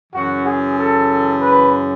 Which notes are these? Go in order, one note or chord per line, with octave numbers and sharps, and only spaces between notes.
F#2 C#3 E3 F#4
G#4
A4
B4